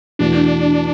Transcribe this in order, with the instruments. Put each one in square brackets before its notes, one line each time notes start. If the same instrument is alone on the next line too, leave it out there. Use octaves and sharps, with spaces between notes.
[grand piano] E2 B2 A3 E4 [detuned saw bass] D4